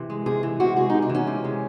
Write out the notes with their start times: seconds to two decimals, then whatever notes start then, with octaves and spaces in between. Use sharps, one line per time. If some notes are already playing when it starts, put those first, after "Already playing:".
Already playing: C3 E3
0.10 G#3
0.26 C3 G#4
0.43 E3
0.60 C3 F#4
0.76 G#3 G#4
0.90 C3 D#4
1.02 D4
1.10 E3 C#4
1.27 C3
1.44 G#3